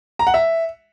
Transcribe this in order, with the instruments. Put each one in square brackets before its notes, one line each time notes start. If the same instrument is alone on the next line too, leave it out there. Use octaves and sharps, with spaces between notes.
[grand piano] A#5
F#5
E5